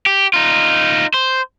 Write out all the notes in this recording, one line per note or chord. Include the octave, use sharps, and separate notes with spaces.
G4
D#4 F4
C5